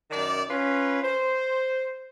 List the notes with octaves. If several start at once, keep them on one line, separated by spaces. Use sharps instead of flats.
F#2 D#3 D5
C#4 F4 B4
C5